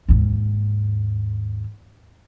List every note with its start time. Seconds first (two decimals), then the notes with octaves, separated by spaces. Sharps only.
0.09 D#2 G#2